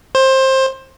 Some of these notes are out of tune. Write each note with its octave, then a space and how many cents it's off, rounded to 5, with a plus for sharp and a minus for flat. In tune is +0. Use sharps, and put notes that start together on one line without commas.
C5 +20